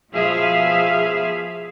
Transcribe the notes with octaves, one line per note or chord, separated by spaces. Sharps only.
B2 F3 G#4 E5 F5